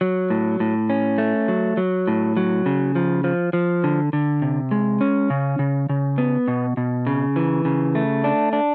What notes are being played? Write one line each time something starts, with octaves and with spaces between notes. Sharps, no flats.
F#3
A2
A2
C#4
A3
F#3
F#3
A2
F#3
C#3
F3
F3
F3
D3
D3
C3
G#3
C#4
C#3
C#3
C#3
B3
B2
B2
C#3
E3
C#3
A3
D4
D4